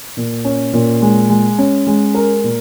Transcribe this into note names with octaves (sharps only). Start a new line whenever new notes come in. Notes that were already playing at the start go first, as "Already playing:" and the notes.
A#2
C#4
A#2
G#3
G#3
C#4
G#3
A#4
A#2